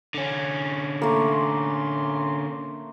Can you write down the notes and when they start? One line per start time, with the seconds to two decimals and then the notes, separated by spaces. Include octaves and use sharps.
0.14 D3 C#4
1.02 A3 A#3 C6